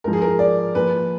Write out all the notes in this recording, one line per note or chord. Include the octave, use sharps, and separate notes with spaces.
G#2 F3 A#4
G#4
A#4
D5
A#2 F3 B4